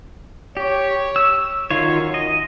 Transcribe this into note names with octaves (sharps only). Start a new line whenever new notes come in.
G4 C#5
E6
F#2 D#3 F4 C#5
D#5